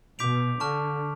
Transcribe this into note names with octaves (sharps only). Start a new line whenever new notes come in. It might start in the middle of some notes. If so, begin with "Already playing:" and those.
B2 D6 G6 B6 D7 F7
D3 A5 C#6 F6